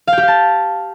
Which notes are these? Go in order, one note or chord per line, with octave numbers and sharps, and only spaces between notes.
F5
G5
G4
F5
A5